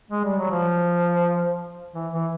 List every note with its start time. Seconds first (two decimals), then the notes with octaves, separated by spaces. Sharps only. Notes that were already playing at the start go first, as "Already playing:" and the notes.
0.11 G#3
0.24 G3
0.38 F#3
0.50 F3
1.94 E3
2.13 E3